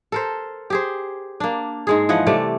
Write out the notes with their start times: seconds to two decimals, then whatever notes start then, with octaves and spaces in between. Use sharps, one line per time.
0.12 A4 A#4 C5
0.70 G4 G#4 C5
1.40 A#3 D4
1.87 G#2 G#3 G#4
2.09 E3 F3 D#5 F#5
2.26 C3 G3 A3 D5